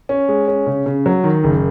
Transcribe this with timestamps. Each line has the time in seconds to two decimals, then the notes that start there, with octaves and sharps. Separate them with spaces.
0.09 C#4
0.29 G#3
0.48 C#4
0.67 C#3
0.86 C#3
1.06 F#3
1.24 D#3
1.44 F#1